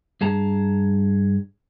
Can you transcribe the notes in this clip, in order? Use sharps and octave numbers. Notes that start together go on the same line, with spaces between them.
G2 G#4 A5 A#5